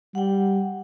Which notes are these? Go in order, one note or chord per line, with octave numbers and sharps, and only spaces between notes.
G3 F#5 G5